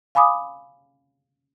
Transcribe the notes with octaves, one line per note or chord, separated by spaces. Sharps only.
F5 G#5 B5 D6 D#6